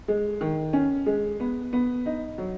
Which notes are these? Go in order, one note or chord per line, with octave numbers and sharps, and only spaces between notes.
G#3
D#3
C#4
G#3
B3
B3
D#4
F#3